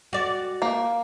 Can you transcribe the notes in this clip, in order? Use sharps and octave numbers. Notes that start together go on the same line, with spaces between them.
F#4 D5
A#3